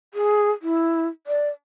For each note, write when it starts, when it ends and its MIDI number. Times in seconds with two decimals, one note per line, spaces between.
0.14 0.51 68
0.62 1.07 64
1.27 1.49 74